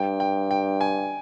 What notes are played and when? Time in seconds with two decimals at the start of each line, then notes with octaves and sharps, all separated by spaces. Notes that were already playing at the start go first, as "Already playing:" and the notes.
Already playing: G2 G5
0.20 G5
0.51 G5
0.81 G#5